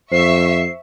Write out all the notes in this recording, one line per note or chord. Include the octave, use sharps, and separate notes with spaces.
F2 C5 E5 C#6 C7